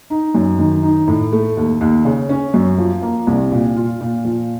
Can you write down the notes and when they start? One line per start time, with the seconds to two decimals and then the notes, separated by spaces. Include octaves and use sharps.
0.10 D#4
0.35 F#2
0.59 D#3
0.83 D#4
1.08 A2
1.32 A3
1.57 D#2
1.81 D#2
2.05 C#3
2.29 C#4
2.54 F#2
2.78 F3
3.02 A#3
3.27 C2
3.51 A#2
3.76 F4
4.01 A#2
4.25 F3